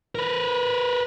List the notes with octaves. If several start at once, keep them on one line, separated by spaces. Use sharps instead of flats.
A#4 B4